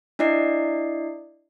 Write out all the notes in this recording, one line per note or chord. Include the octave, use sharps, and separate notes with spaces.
D4 E4 D5 D#5 C7